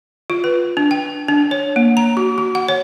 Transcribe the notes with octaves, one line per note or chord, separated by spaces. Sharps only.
F4
B4
D4
G5
D4
C#5
A#3
A#5
F#4
F#4
F#5
C#5